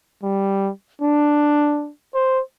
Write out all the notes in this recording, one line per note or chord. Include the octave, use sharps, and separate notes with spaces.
G3
D4
C5